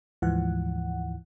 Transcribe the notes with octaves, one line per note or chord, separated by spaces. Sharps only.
D2 G#2 E3 F3 F#5